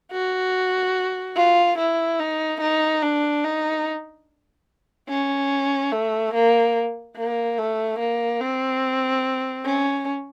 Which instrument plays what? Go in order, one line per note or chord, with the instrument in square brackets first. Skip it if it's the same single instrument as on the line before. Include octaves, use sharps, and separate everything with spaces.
[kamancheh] F#4
F4
E4
D#4
D#4
D4
D#4
C#4
A3
A#3
A#3
A3
A#3
C4
C#4